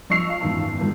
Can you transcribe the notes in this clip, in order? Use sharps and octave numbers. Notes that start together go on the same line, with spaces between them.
F3 D#5 C#6 E6 C7 F7
F5
F#1 E2 G#2 D#3 F4 A5
G#2 D#3 G#3